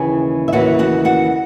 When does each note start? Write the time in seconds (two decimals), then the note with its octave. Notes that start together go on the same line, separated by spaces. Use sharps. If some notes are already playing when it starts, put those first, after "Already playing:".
Already playing: D#2 C#3 E3 A#3 E4 G#4 G#5
0.48 E5
0.52 D#2 C#3 E3 A#3 E4 F#4 F#5
0.79 F#4 F#5
1.05 F#4 F#5